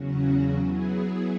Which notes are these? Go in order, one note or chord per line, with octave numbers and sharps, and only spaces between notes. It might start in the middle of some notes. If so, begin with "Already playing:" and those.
Already playing: E2 C#3 F#3 C#4 F#4
F#3 B3 E4 G#4